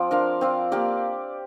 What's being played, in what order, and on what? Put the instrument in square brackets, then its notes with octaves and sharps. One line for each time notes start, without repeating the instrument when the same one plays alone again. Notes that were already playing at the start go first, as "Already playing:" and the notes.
Already playing: [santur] F3 C4 D5
D4 A#4 F5
C4 F4 D5
A#3 G4 A#4 D5